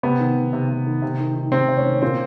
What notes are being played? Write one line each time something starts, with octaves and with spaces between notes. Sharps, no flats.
C3 B3
D#3
D#3
C3
C3
D#3
C3
D#3
D#3
C3 C4
C3
C#4
D#3
A#2 C4